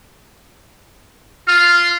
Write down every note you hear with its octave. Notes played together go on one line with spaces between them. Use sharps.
F4 F6